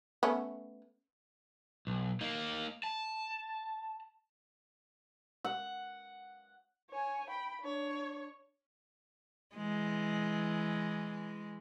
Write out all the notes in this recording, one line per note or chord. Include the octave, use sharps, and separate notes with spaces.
A3 B3 C#4
B1
A#3 D#4
A5
F#5
C#5 G#5
G5 B5
D4 C#5
E3 G#3